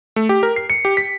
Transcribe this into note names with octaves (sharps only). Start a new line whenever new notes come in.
A3
G4
A#4
C7
C#7
G4
B6